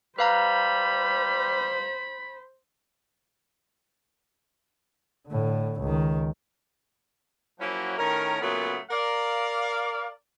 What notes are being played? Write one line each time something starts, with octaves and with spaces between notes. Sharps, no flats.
G3 B4 C5 F5 A#5 B5
A2 D3
C#2 D#3
F3 F#3 A#3 C#4 E4 F#4
A2 D#3 C#4 A#4
A#2 C#3 F#3 A3 B3
A#4 D5 F5